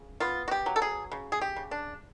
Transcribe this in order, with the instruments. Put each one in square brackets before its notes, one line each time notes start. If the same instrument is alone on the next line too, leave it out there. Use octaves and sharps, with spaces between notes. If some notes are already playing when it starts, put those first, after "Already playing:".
Already playing: [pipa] C#3
B3 F4
F#4
G4
F#3
A4
G#4
C#3
G#4
G4
C#3
D4